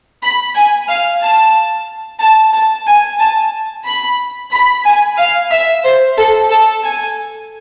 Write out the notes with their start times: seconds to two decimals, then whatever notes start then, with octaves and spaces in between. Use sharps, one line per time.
0.22 B5
0.54 G#5
0.87 F5
1.20 A5
2.20 A5
2.53 A5
2.86 G#5
3.19 A5
3.85 B5
4.52 B5
4.85 G#5
5.18 F5
5.50 E5
5.84 C5
6.16 A4
6.50 A4
6.83 G#5